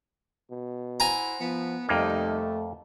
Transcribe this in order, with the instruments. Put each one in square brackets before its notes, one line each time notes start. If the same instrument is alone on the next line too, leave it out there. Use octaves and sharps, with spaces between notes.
[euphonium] B2
[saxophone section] E4 C5 F#5 [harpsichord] G#5 A#5
[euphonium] F3 [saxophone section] B3
[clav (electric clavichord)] F2 A#3 [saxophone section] C3 G3 D#4 [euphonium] A3